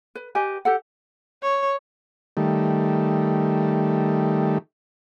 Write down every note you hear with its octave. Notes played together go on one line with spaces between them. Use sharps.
B4
G4 B4 D#5 G#5
G4 A4 F#5
C#5
D#3 G3 A3